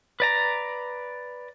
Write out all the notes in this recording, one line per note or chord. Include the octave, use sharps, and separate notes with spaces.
B4 D5 A#5